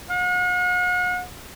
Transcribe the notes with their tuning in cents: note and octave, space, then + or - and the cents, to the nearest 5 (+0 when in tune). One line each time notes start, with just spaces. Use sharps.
F#5 -45